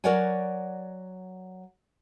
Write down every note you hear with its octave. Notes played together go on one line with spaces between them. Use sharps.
F#3 A#4 C#5 D5 F#5 G#5